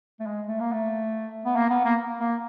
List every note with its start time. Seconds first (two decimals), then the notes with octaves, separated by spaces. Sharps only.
0.20 A3
0.26 G#3
0.48 A3
0.60 A#3
0.73 A3
1.45 B3
1.56 A#3
1.70 B3
1.85 A#3
2.20 A#3